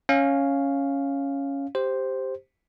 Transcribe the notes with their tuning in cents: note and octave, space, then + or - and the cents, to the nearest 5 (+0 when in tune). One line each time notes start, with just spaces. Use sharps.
C#4 +0 F5 +0
G4 +0 C5 +0